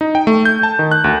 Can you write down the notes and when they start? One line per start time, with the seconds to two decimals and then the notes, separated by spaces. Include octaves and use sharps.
0.01 D#4
0.15 G5
0.27 A3
0.45 G6
0.63 A5
0.79 D#3
0.91 F#6
1.04 D2